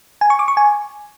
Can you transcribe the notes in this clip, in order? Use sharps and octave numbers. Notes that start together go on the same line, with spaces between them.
G#5
C#6
D6
C#6
G#5